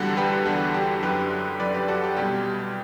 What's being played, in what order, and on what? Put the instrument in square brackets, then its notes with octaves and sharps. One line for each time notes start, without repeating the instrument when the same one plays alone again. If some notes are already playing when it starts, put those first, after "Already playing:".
Already playing: [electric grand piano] E2 D3 G3 F#4 A4
G4 B4
E2 D3 G3 F#4
G4
F#2 D3 F#3 G4 B4
F#2 D3 F#3 B4 D5
G4 B4
F#4 A4
G4
C2 B2 G3 G4